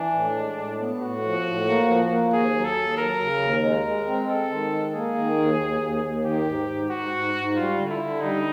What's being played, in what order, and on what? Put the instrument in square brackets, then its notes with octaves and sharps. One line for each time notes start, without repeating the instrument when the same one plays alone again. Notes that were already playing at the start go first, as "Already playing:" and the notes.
Already playing: [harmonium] E3 [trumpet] D4
[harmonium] A2
G#3
A2
B3
[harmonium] A2 [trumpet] F#4
[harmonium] F3
A2
A#3
F3
A#3
[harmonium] D#2 [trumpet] G#4
[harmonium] F#3
[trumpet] A4
[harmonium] D#2
[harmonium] F#3 [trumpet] A#4
[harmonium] C#3
D#2
[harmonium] G#3 [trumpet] A#4
[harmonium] G#3
C4
[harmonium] G#3 [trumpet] A4
[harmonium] D#3
G#3
[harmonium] A#3 [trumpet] G#4
[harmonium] D#3
D#2
D#2
D#2
D#2
[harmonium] D#3 [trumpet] G4
[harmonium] G#2
G#2
[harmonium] G#2 [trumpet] F#4
[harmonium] G#2
G#2
[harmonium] G3 [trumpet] F4
[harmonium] D3
[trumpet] E4
[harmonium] D3
[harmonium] G3 [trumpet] D#4